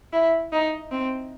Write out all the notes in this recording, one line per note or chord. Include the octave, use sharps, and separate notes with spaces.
E4
D#4
C4